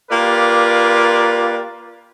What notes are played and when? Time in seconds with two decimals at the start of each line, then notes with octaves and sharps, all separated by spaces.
0.10 A#3 F4 G4 A#4 B4 D5